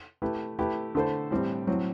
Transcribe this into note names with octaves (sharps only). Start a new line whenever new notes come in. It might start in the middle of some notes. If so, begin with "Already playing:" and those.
A3 E4 G4 B4
A3 E4 G4 B4
D3 A3 E4 A4 C5
A2 E3 G3 C4
A2 F#3 C4